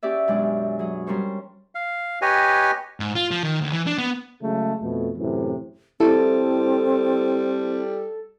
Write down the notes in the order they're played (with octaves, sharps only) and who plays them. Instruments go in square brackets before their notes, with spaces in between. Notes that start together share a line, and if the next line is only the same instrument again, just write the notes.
[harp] C#4 G4 G#4 D5 E5
F#2 B2 G#3 D4 G#5 D6
F#3 G#4
G3 C#4 A#4 C5 C#5
[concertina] F5
G4 B4 C#5 D#5 G#5
[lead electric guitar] G#2
F4
F3
D#3
D2
E3
D4
B3
[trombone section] C#3 F#3 G#3 A3
F2 B2 A3
F#2 A2 C3 E3
[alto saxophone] G3 [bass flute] C4 [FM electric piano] E4 [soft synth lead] A4